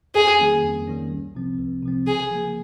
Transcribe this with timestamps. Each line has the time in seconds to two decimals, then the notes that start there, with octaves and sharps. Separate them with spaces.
0.15 F2 G#4
0.39 D#3 G3 A#3 C#4
0.63 F2
0.88 D#3 G3 A#3 C#4
1.11 C2
1.35 C3 F3 C4
1.59 C2
1.83 C3 F3 C4
2.07 C#3 G#4
2.31 F3 A#3